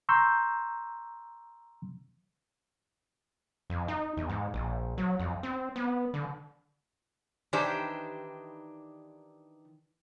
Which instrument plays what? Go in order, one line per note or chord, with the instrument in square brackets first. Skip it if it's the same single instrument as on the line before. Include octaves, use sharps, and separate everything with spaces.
[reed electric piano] A#5 C6 C#6 E6 G6
[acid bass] F2
D#4
E2
G#2
A#1
F#3
F2
C4
B3
D3
[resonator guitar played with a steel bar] D#3 E3 D4 D#4 G4 C5